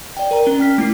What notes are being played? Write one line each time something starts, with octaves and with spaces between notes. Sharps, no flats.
D5 G5
A#4 D5 A#5
C#4 G7
G5 F6 B6
A3 E4 C7